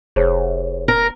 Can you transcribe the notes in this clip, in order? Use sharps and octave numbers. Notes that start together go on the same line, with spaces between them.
F1 G#4 C5 C#5
A#4